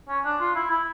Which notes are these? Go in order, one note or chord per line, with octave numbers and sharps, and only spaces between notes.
C#4
D4
F4
E4
E4